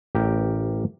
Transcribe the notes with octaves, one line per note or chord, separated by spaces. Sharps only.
A1 G4 A#4 G5